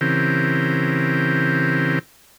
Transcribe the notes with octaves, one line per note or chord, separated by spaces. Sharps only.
C#3 E3 C4 G4 A#4